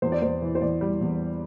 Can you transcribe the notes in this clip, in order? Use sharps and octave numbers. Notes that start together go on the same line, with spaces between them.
E2 C5
D5
E2 C5
E3
C5
E2 D5
G3
E2